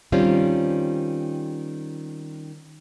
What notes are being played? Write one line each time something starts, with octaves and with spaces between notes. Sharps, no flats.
D#3 G3 C4 C#4 F4